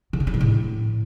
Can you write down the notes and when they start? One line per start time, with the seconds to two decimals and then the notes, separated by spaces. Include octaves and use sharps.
0.13 D3
0.20 A3
0.27 G3
0.34 G#2
0.41 A2